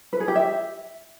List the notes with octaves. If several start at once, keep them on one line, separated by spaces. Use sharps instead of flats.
B4
G#4
G4
E5